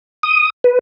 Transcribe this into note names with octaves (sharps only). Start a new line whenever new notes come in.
D#6
B4